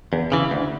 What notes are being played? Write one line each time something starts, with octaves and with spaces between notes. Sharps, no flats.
E2
C#3 E3
D2